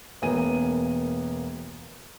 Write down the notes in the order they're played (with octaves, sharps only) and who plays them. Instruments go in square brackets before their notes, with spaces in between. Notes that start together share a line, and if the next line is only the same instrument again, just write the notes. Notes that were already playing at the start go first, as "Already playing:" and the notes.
[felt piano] E1 A#3 B3 G#5 D#7